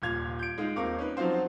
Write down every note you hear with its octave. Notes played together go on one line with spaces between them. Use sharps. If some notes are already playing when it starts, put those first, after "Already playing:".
D#1 A#2 F4 G#6 F7
G6 D7
G#3 D#4 F4
D#1 C4 A#4 F5 C#6 D6
C#4 D#4 B4
F3 F#3 C4 D#4 F4 C5